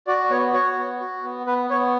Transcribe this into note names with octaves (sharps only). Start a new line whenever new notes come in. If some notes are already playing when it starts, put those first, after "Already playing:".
F#4 D5
B3 C#5
F#4 C#5
B3
F#4
B3
B3 B4
B3 C#5